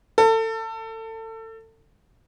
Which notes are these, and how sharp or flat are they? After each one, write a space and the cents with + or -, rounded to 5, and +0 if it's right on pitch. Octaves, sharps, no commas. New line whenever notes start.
A4 +30